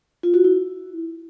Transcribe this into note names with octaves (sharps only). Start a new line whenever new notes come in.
F4
F#4
E4